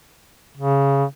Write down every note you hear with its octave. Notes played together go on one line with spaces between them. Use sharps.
C#3